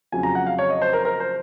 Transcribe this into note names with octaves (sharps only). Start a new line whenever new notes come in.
F2 C#3 F#3 G#5
A#5
F#5
F5
C#5
D#5
C5
A#4
A#4
C5